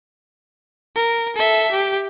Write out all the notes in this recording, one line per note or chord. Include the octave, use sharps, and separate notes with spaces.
A#4
A4 E5
G4